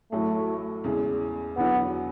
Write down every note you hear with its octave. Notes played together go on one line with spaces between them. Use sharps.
A1 A2 F#3 A3
E2 C#3 G#3
E2 D3 F#3 B3